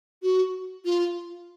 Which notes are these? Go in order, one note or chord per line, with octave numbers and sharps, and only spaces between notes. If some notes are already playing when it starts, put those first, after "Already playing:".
F#4
F4